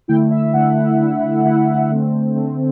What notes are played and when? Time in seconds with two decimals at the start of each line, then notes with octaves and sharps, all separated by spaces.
0.08 D3 A3 E4 G5
0.31 E5
0.53 D3 A3 E4 F#5
0.99 D3 A3 E4
1.44 D3 A3 E4 F#5
1.90 D3 A3 C4
2.35 D3 A3 C4